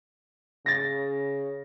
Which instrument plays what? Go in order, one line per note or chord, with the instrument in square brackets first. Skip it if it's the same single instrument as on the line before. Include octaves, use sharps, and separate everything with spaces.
[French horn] C#3 [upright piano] A6 A#6